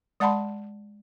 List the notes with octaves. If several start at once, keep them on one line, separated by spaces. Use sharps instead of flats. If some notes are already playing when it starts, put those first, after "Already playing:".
G#3 D5 F#5 A5 B5 C6